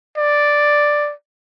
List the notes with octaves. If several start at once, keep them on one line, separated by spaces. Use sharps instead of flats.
D5